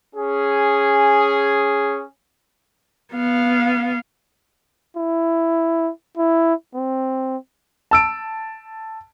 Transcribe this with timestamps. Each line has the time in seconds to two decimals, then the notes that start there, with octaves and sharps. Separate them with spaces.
0.15 C#4 G#4
3.13 B3 F5
4.97 E4
6.17 E4
6.75 C4
7.91 A5 E6 D7